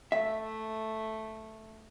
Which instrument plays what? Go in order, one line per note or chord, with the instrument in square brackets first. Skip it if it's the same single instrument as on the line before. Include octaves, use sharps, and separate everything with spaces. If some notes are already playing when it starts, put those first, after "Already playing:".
[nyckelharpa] A3 [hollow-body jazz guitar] E5